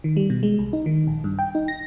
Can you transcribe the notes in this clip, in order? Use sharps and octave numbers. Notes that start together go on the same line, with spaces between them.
D#3
G3
B2
G#3
C2
D#4
D#3
A#1
G2
G5
D#4
A#6